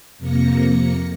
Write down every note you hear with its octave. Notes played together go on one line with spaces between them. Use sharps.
F2 C3 A#3 A#6 C#7